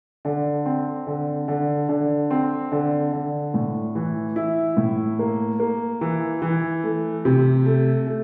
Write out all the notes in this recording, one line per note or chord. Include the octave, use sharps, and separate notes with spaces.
D3
C4
D3
D3
D3
C4
D3
D3
A2
E3
E4
A2
A#3
A#3
E3
E3
A3
C3
A3
A3